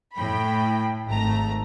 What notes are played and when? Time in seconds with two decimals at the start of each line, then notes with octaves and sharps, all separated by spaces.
0.15 A2 G5 B5
1.08 G#1 A3 A#5